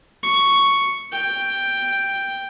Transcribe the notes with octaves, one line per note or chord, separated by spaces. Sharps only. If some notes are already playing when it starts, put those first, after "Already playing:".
C#6
G5